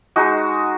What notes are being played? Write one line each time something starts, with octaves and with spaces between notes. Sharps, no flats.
G#3 D#4 F#4